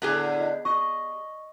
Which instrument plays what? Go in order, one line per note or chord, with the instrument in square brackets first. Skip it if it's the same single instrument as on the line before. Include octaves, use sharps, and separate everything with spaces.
[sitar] A2 D3 [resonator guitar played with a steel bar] B3 G4 G#4
[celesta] D#5
[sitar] D#5 [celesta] C#6